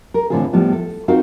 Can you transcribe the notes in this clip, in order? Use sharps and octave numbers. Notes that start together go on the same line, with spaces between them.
A#4
A2 D3 E3 C4 F4 G#4
A2 F3 G3 B3
A4
C4 D#4 F4 F#4 A#4 F5